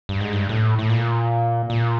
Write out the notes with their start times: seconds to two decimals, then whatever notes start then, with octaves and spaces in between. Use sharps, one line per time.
0.09 G2
0.21 G#2
0.33 G2
0.49 A2
0.79 A2
0.90 A#2
1.70 A#2